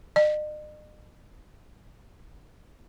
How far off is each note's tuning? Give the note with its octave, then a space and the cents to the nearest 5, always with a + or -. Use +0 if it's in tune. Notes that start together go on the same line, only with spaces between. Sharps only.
D#5 -45